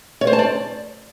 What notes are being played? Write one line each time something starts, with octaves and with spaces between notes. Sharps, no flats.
C#5
C5
A5
D5